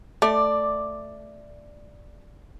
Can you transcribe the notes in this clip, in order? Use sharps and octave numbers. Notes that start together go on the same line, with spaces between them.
A3 D5